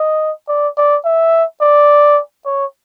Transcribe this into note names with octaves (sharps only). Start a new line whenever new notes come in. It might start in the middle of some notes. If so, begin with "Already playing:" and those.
Already playing: D#5
D5
D5
E5
D5
C#5